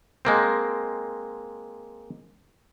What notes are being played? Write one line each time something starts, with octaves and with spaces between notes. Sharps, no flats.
G#3 A#3 C4